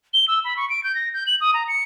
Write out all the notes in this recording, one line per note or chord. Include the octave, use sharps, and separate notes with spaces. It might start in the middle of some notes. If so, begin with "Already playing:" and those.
G7
E6
B5
C#6
D7
G6
A#6
G6
F#7
D#6
A#5
C#7